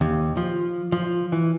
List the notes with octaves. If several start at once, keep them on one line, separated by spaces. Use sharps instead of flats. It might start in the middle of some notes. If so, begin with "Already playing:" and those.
D#2
F3
F3
E3